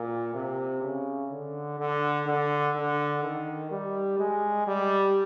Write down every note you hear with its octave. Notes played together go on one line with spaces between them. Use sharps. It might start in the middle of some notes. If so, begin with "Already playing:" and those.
Already playing: A#2
C3
C#3
D3
D3
D3
D3
D#3
G3
G#3
G3